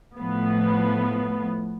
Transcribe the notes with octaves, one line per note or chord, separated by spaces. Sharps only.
A2 F3 B3